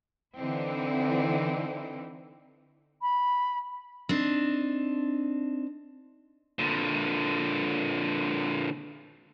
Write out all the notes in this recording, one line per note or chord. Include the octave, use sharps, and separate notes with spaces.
D3 E3 C4 D#4 E4
B5
C4 D4 D#4
A#2 D3